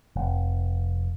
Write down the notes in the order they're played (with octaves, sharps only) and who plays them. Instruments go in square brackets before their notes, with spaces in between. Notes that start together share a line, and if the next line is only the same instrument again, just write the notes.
[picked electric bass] F1